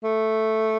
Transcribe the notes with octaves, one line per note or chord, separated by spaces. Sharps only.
A3